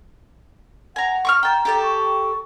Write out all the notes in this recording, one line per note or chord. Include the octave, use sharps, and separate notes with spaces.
F#5 G#5 A#5
C#6 D6 F6
G5 A5 A#5
G4 A4 A5
C#6